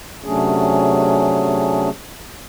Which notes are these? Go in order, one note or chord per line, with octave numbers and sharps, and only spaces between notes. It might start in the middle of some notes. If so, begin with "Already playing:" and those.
C3 F#3 A3 C#4 D4 G#4